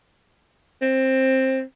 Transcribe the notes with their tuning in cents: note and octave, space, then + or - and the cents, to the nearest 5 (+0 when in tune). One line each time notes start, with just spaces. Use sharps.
C4 +10